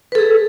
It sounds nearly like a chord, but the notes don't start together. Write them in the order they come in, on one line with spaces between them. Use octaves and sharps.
B4 A4 G#4